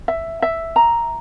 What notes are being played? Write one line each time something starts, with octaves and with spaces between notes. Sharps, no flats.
E5
E5
A#5